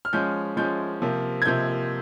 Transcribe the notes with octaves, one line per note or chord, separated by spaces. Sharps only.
F6
F3 G#3 C#4 G6
F3 G#3 C#4 G6
C3 F3 A#3
G#6
C3 F3 A#3 G6